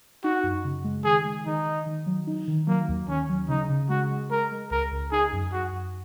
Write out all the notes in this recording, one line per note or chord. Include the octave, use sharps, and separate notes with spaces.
D#4 F#4
F#2
C#3
G#3
D#3 G#4
G#3
D#3 D#4
D#3
D#3
F#3
D#4
D#3
F#3 A#3
D#2
D#3 C#4
F#3
C#3 D#4
C#3
G#3 F#4
G#3
G#3 A#4
G#3
C#2 A#4
C#2
D#4 G#4
F#2
F#2 F#4
F#2